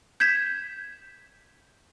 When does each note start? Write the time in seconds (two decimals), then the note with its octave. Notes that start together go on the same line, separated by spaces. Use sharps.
0.20 G6 G#6 B6 E7